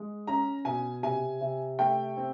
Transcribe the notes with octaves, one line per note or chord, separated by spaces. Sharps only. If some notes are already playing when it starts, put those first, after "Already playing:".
Already playing: G#3
C#4 A#5
B2 G#5
C3 G#5
C3
A3 G5
C4